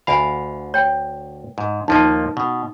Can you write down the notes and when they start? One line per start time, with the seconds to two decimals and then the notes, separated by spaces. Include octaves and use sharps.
0.07 D2 E5 F5 G#5 B5
0.74 C#5 G5
1.58 G#2
1.88 D#2 F3 A#3 D#4 A5
2.37 B2